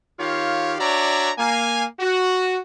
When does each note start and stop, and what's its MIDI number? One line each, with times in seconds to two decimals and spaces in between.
0.20 0.74 51
0.20 0.74 65
0.20 0.74 67
0.20 0.74 73
0.20 0.74 77
0.79 1.30 62
0.79 1.30 66
0.79 1.30 73
0.79 1.30 74
0.79 1.30 76
0.79 1.30 82
1.39 1.84 58
1.39 1.84 77
1.39 1.84 80
2.00 2.58 66